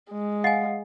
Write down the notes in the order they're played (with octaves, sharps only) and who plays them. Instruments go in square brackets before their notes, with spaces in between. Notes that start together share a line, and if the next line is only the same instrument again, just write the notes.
[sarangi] G#3
[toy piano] D#5 G#5 [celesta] F5 F#5 C7